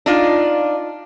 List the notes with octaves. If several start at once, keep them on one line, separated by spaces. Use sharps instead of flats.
D4 D#4 F4